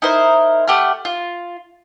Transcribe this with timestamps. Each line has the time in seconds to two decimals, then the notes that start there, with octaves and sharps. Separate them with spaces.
0.02 D#4 E4 A#4 C5
0.68 A3 G4 F#5 F6
1.05 F4